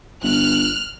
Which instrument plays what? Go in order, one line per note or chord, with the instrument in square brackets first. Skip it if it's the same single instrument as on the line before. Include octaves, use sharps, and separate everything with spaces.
[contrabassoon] G1 [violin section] F6 F#6